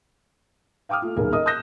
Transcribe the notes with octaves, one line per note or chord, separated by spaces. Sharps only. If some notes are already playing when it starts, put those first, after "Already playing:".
F5 G5 D6 D#6 F6
A3 F4
D#1 B1 G#4 A#4
A#4 D#5 D#6
D#6 F#6 G6 A#6 E7